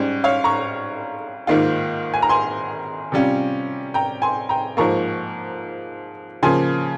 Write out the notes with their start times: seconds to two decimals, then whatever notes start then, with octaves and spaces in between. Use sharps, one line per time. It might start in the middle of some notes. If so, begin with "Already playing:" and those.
Already playing: G#2 G3 C#4
0.24 C#5 F5
0.44 A#5 C#6
1.47 G#2 D#3 A#3 F4
2.14 G#5
2.22 A#5
2.29 G#5 C6
3.12 C3 G3 C#4 F4
3.94 G5 A#5
4.22 G#5 C6
4.49 G5 A#5
4.77 G#2 F3 A#3 A#5 C#6
6.43 C#3 F3 A#3 G#5 C6